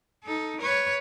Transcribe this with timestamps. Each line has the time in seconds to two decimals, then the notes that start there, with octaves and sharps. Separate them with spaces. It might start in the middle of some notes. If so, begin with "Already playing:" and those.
0.24 D#4 A4
0.61 B4 C#5